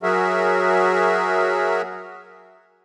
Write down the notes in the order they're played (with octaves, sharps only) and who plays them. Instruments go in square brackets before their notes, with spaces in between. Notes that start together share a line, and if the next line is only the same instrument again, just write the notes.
[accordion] F#3 F#4 G#4 A#4 E5